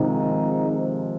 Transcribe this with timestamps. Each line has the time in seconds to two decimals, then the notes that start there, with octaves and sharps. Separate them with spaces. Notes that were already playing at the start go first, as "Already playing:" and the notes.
Already playing: G#2 C3 D#3 F3 G#3 D#4
0.68 C3 F3 G#3